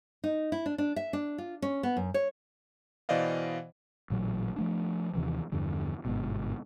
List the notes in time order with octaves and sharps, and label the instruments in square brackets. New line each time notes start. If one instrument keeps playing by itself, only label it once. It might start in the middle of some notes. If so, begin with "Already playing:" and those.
[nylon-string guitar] D#4
E4
D4
D4
E5
D4
F4
C#4
B3
F#2
C#5
[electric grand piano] B2 E3 C5 D5 D#5 F5
[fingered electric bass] A1 A#2 F#3
F3 A3 D4
D#2 C3 E3 F3
E2 G2 D3 F3
G1 G#2 B2